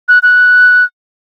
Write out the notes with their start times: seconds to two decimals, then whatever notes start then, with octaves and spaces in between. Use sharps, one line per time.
0.08 F#6
0.23 F#6